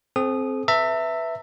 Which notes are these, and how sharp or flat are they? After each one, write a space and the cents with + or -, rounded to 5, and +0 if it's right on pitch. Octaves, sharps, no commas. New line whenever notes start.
C4 +0 A4 -45 D#6 -15
B4 +0 E5 +0 A5 +45